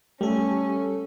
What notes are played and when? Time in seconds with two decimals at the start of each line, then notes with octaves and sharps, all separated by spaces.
0.21 G3 A3 C#4 G4 A4